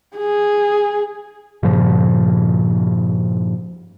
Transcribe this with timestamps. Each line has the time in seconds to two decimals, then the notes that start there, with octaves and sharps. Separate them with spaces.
0.17 G#4
1.63 G2 A#2 C#3 F3